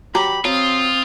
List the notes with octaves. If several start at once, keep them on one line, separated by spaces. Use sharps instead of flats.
F#3 G4 A#5 B5
F#3 C4 F4 D#6